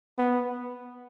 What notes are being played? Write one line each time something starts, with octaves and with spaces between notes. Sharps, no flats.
B3